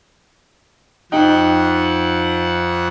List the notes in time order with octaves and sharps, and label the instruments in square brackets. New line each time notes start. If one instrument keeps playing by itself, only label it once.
[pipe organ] F2 F#5 [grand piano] D#4 G5